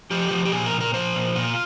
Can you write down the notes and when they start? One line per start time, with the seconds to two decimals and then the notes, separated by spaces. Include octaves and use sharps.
0.11 F3 G4
0.31 F3
0.45 G4
0.52 A#2 G#4
0.66 A#4
0.73 A#2
0.81 A#4
0.94 F3 C5
1.16 A#2
1.36 A#2 F4